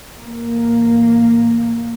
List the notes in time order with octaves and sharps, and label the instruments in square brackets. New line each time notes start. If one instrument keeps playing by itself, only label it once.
[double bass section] A1 A2 A#3